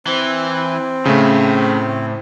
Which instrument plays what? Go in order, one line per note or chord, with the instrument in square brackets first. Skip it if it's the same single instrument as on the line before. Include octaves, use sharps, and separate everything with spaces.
[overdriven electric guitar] E3 [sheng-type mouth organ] C4
[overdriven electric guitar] A2 [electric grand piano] C#3 A3